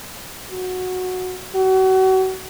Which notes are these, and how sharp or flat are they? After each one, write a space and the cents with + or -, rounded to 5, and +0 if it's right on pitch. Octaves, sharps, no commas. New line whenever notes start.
F#4 -10
F#4 +35